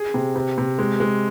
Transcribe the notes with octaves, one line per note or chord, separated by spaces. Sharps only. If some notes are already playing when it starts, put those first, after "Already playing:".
Already playing: G#4
C3
C3
C3
G#3
G#3